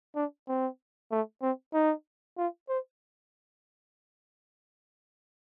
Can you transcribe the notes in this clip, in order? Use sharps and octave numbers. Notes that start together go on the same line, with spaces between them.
D4
C4
A3
C4
D#4
F4
C5